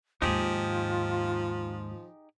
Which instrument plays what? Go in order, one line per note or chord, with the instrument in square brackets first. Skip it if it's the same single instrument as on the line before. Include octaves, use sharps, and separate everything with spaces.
[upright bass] D#2 G#2 [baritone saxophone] F3 [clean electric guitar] D#4 G4 G#4 [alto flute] F4